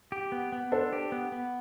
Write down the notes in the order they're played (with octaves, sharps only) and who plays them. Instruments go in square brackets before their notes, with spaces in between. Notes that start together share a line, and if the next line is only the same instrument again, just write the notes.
[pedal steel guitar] G4
B3
B3
[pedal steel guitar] D4 [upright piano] A4 C5
[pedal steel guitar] G4
B3
B3